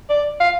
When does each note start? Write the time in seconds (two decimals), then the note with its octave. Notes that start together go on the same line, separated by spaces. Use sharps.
0.10 D5
0.40 F5